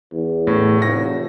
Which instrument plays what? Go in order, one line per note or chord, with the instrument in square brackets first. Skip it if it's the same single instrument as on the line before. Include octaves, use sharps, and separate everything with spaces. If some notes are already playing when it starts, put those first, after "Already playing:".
[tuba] E2
[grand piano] A2
[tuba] F1 [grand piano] A#6